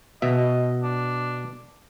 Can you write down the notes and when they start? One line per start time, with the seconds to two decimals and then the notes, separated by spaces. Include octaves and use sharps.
0.22 B2 D#5 E5
0.84 D4